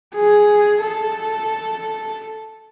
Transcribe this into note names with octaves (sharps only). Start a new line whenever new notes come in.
G#4
A4